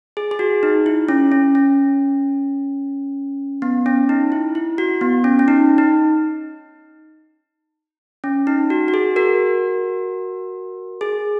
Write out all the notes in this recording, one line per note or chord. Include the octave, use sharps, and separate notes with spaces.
G#4
G#4
F#4
D#4
E4
C#4
C#4
C#4
B3
C#4
D#4
E4
E4
F#4
B3
C#4
C#4
D#4
D#4
C#4
D#4
F#4
F#4
G#4
F#4 A#4
G#4